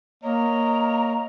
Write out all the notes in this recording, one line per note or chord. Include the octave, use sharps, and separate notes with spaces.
A#3 C#5 D#5 A#5